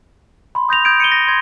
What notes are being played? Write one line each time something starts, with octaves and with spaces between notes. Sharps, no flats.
B5 C6
D#6 G6 A#6 F7
D#6 G6 G#6 D7
C#7 D#7 G7
A#6
C6 G#6